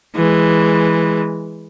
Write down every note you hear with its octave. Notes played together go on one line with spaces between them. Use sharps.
E3 G#3